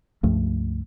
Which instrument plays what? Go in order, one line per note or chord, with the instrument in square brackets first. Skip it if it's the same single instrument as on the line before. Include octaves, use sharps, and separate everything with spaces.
[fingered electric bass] C#2 G2 F3 A3